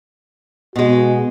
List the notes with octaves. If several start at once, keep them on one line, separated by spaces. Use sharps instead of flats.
B2 G#3 F#4